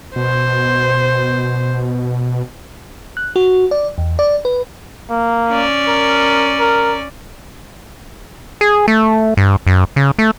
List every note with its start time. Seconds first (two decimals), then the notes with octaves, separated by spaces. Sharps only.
0.16 B2 C5
3.17 F#6
3.36 F#4
3.71 D5
3.98 E2
4.19 D5
4.45 B4
5.10 A#3
5.50 C#4 D5
5.88 A#4
6.60 A#4
8.61 G#4
8.88 A3
9.37 G2
9.67 F#2
9.96 C#3
10.19 A3